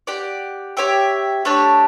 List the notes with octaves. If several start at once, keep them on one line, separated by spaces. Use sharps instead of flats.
G4 D5 F#5
G4 C#5 E5 G5
A3 D4 G4 C#5